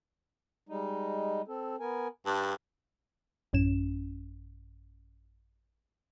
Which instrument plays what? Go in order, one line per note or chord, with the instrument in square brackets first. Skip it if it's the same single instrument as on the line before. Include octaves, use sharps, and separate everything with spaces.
[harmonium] G3 G#3 D#4
C4 A4
B3 A#4 G#5
[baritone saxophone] G2 [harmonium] A5
[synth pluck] A1 F#2 C#4 E7